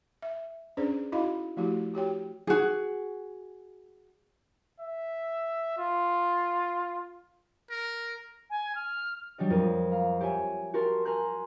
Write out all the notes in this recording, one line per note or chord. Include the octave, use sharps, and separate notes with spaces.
E5
C#4 D4 G#4 B4 C5 D5
D#4 E4 F#4 D#5 F5 B5
F3 A3 E4 F#4 G4
F#4 G4 C#5 G5
F#4 G#4
E5
F4
A#4
G#5
F6
F#3 G3 D4 F#4 D#5
F2 A#4 D#7
F5 A#5
G4 C#5 E5 G#5
F#4 G4 A#4 A5 C6
A#4 G#5 A#5 C6 F#6 G6